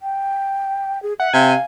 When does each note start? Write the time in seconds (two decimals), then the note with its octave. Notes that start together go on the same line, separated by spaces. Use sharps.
0.02 G5
1.03 G#4
1.20 E5 F#5
1.33 C3 F5 G#5